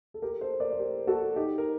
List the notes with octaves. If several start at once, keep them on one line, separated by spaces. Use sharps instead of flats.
A4
G4 A#4
A4 C5
A#4 D5
C5
G4 A#4
F#4 A4
D#4 G4
A#4